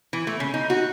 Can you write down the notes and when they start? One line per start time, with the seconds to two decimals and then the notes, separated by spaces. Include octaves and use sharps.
0.13 E3
0.27 A3
0.40 C#3
0.54 D#4
0.70 F#4